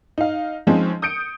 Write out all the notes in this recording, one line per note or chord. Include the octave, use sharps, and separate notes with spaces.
D#4 F5
F3 G#3 C4 C#4 D#4
D#6 G6 C#7 D7